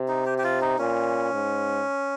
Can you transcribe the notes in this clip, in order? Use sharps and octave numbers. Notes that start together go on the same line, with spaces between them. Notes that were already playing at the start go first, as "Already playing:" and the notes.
Already playing: C3
D#4
G4
G4
F4
D#4
A#2 C#4
G#2